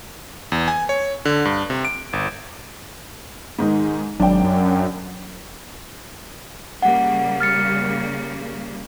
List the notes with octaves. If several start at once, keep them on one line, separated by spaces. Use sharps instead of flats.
E2
G#5
C#5
D3
G2
C3
D7
G1
G#2 D#3 D#4
G#1 F#3 D4 G5
F#2
C#3 G3 A#3 F#5
F6 A6 C#7